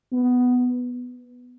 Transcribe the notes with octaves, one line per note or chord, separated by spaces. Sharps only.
B3